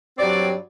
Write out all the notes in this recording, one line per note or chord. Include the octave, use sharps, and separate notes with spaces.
G2 F#3 C4 D5